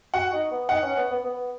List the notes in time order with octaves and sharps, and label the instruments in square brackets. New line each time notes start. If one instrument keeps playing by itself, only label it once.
[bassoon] F#4 [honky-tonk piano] F#5
[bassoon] D#4
B3
[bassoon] D#4 [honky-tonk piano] F#5
[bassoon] C#4
B3
B3
B3